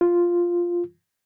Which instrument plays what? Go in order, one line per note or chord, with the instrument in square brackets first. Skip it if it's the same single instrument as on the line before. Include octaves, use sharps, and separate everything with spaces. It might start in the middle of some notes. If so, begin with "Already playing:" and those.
[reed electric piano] F4